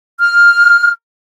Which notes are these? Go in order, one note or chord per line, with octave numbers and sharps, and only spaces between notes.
F6